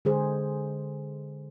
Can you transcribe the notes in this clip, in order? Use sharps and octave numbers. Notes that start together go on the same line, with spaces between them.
D3 G#3 G#4 C5